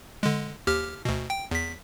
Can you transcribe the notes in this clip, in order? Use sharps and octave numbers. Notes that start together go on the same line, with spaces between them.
D3 G#3
D#2 G4 F6
D2 B2
G5
E2 B6